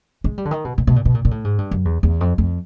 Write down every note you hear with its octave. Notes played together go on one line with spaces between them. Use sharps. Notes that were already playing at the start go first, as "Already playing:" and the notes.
G#3
G3
D3
D#3
B2
A#2
B2
A#2
B2
A#2
A#2
A2
G#2
G2
F#2
E2
E2
F2
F2